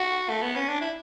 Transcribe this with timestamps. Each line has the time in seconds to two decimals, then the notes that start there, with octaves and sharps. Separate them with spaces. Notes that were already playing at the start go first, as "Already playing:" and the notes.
Already playing: F#4
0.29 A3
0.42 B3
0.56 C#4
0.68 D4
0.81 E4